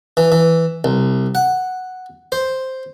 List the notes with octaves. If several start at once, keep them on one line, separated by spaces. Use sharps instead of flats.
E3
E3
C2
F#5
C5